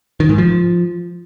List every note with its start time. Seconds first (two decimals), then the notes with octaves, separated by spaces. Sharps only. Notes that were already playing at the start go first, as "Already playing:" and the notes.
0.20 D#3
0.29 G#2
0.38 F3